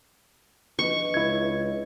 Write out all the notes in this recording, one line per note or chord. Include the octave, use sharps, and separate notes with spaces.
F3 D4 B4 D#5 C#6
C#2 E4 G#6